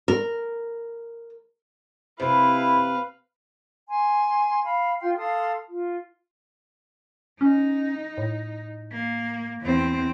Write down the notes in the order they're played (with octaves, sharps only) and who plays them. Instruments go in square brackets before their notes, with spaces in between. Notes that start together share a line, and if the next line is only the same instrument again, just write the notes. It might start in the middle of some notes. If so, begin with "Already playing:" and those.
[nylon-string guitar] A#4
[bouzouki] C3 C4 [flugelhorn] E4 [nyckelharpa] B4 F5 [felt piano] C5
[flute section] G#5 C6
F5 B5
F4 F5 G5 C6
A4 F5 C6 D#6
F4
[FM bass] C#4 [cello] D#4
[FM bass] A2
[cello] A#3
E2 C4